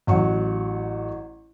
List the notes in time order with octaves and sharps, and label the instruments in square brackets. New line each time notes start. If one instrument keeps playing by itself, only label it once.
[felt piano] A1 F#3 F#5 C#6